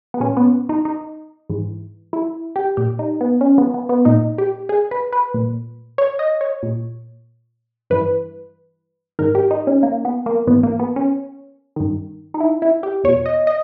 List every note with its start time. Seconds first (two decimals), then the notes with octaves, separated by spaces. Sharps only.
0.14 B3
0.20 A#2 C#4
0.37 B3
0.69 D#4
0.85 D#4
1.50 G#2 E3
2.13 E4
2.56 G4
2.77 A#2 G4
2.99 D#4
3.21 B3
3.41 C#4
3.58 B3
3.74 B3
3.89 B3
4.05 A#2 D#4
4.38 G4
4.69 G#4
4.91 B4
5.13 B4
5.34 A#2
5.98 C#5
6.19 D#5
6.41 C#5
6.63 A#2
7.90 G2 E3 B4
9.19 G#2 D#3 A#4
9.35 G4
9.51 D#4
9.67 C#4
9.83 A#3
10.05 B3
10.26 A#3
10.47 G#2 E3 B3
10.63 A#3
10.80 B3
10.96 C#4
11.76 G2 D#3
12.34 D#4
12.40 E4
12.62 E4
12.83 G4
13.04 E2 B2 C#5
13.26 D#5
13.47 D#5